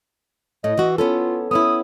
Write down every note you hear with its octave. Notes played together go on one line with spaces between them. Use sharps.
A2 D#5
E3 F#4
B3 C#4 F4 A4
B3 C#4 E4 D#6